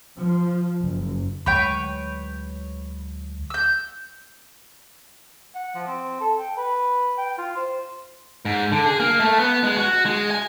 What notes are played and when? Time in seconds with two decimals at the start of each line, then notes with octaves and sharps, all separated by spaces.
0.17 F3
0.82 F#1
1.46 D2 F#3 G#3 B4 C#5 G5
3.50 E6 G6
5.55 F#5
5.75 F3
5.88 C4
6.21 A4
6.39 G5
6.58 B4
7.18 G5
7.38 F4
7.57 C5
8.45 G#2
8.72 D3
8.86 G#4
9.00 A#3
9.20 A3
9.39 B3
9.64 G#3
9.77 F#4
10.05 G#3
10.31 G#5